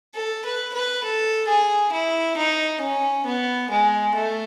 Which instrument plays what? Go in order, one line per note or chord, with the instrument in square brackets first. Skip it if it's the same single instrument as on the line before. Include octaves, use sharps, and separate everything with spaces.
[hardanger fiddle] A4
B4
B4
A4
G#4
E4
D#4
C#4
B3
G#3
A3